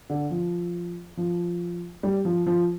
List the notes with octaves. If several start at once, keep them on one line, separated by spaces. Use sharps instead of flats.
D3
F3
F3
G3
F3
F3